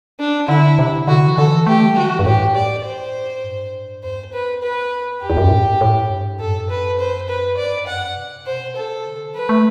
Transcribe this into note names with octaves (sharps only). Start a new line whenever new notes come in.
D4
D3 E4
C3
D3 F#4
E3
D3 A4
E3
A3 G4
G3
D3 F#4
E3
G2
A2 G4
D5
C5
G2
E2 C5
B4
B4
F#2 G4
E2
F#2
A2
A2
G2
F#2 A4
B4
C5
B4
G2 D5
F#2 F#5
C3
B2 C5
C3 A4
D3
F#3 B4
A3